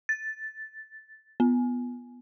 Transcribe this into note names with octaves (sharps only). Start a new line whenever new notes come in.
A6
B3